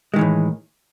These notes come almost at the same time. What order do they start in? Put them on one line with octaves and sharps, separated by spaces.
G#3 D#3 E3 A2